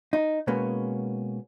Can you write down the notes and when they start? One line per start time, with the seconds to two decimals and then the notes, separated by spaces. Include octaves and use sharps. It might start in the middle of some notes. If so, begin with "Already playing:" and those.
0.13 D#4
0.47 B2 G#3 A#3 B3 C#4